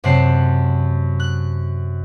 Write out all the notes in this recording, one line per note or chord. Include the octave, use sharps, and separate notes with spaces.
F#2 C3 C4 F#5 A5 C7
F#6